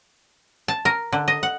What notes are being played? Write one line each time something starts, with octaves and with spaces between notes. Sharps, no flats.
A5
A#4
D3
D#5
F#5